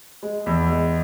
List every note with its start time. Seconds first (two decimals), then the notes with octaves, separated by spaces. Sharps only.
0.23 G#3
0.46 E2
0.69 G#3